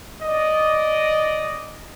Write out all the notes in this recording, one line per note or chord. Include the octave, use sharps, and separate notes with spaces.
D5 D#5